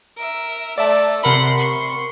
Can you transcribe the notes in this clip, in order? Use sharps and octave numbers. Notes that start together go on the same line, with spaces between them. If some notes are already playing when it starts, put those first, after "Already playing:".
A#4 E5
A3 D5 E5 A5
C3 A#4 F#5 B5 C6
C6 C#6